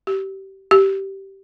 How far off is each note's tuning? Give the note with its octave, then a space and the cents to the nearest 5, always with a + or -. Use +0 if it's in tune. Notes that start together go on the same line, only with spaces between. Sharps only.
G4 -25
G4 -15